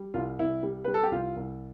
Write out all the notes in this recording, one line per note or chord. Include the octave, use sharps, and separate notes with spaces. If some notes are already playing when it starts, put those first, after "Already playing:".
Already playing: G3
C2 F4
C2 E4
G3
G3 B4
A4
G4
C2 F4
C2